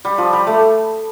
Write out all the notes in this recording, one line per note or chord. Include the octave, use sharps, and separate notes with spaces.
G3
F3
G3
A3